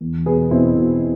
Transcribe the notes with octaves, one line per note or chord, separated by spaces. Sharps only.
E2
B2 G#4 B4
B2 C4 E4
B2